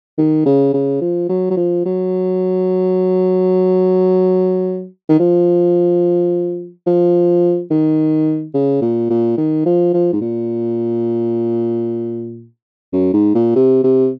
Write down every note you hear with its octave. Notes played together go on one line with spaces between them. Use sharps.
D#3
C#3
C#3
F3
F#3
F#3
F3
F#3
D#3
F3
F3
D#3
C#3
A#2
A#2
D#3
F3
F3
G#2
A#2
F#2
G#2
A#2
C3
C3